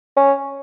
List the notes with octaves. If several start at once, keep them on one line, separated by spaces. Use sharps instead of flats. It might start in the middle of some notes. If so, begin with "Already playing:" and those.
C#4